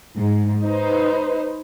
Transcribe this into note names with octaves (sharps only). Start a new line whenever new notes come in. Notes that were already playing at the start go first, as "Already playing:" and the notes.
G#2
D#4 B4 C5